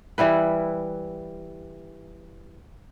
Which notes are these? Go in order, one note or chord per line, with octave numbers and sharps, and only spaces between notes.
E3 G3 E4 B4